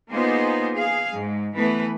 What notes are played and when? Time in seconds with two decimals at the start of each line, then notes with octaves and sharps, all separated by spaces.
0.11 A#3 B3 D#4 F4 G#4 C5
0.75 G#4 F5
1.15 G#2
1.55 E3 A3 B3 B4